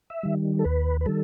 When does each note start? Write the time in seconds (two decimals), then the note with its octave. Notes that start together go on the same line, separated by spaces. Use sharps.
0.10 E5
0.23 D#3 G3
0.59 A4
0.64 D#2 B4
1.01 B4
1.06 D#3 G3 A4